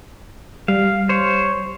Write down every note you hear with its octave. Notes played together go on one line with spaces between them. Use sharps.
G3 F5
C5 C#5